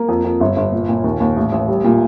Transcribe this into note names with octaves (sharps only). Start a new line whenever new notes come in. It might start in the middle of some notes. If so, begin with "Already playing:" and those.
Already playing: A#3
F2
F2
G1
G1
A#2
A#2
D#2
D#2
A1
A1
G3
A#2